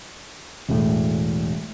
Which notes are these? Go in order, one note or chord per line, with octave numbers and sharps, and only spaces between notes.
E1 A2